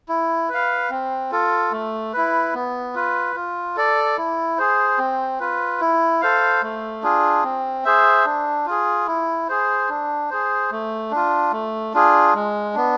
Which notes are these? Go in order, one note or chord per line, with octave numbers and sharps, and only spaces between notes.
E4
B4 F5
C4
F4 A4
A3
E4 B4
B3
F4 B4
F4
A4 D5
E4
G#4 C5
C4
F4 B4
E4
A4 C5 F5
A3
D4 F4 G#4
C4
G#4 C5 E5
D4
F4 G#4
E4
G#4 C5
D4
G#4 C5
A3
D4 F4
A3
D4 F4 G#4
G#3
B3 D4